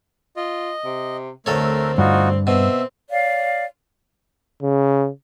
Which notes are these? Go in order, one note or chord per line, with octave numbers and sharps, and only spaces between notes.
F4 D#5
C3
D2 A3 C4 A4 A#4 C#5
G2 D#4 F4 F#4
B2 C4 E5
C#5 D5 F5
C#3